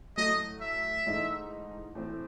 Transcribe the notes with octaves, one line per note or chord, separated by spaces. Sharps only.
A2 F#3 A3 D#5
E5
G#2 E3 A3 D#4
A2 E3 C4